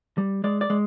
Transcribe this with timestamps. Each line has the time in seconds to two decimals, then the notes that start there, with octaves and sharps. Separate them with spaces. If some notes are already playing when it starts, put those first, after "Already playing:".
0.18 G3
0.44 G#3 D5
0.61 D5
0.70 G#3